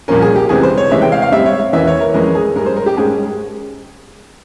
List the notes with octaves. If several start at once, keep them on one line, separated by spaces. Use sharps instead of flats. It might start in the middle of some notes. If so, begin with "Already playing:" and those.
C2 A#2 F3 A#3 C#4 A#4
G#4
G4
C#2 C3 E3 G3 C4 G#4
C5
C#5
C3 E3 G#3 C4 E5
G5
F5
F5
G#2 G3 C4 E5
C#5
E2 E3 A#3 C#4 E5
C#5
A#4
F2 E3 G#3 C#4 A#4
G#4
G#2 G3 C#4 A#4
C5
A#4
G4
G#2 G3 C#4 G#4